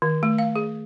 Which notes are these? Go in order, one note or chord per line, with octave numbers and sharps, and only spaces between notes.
D#3
A3
F5
G#4